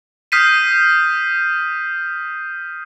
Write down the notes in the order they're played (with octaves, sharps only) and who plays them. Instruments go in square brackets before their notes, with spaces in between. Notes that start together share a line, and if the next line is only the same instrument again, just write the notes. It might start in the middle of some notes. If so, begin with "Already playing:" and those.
[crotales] D#6 F6 G6 B6 C7 D#7